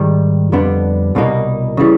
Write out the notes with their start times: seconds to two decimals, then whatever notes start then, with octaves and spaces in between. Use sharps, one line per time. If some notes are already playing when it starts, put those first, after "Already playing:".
Already playing: G#2 D#3 G3
0.52 F2 D3 G3 B3 D4
1.15 C2 B2 G3 A#3 D#4
1.77 C#3 E3 G3